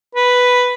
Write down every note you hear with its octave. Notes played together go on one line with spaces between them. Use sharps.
B4